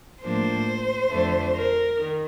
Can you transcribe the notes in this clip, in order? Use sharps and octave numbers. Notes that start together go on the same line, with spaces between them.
A2 F3 A#3 D4 C5
F2 D3 A3
A#4
D#3